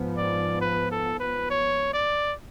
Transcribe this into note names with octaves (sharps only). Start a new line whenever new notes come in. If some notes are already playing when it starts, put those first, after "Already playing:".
Already playing: G#2 F3 B3
D5
B4
A4
B4
C#5
D5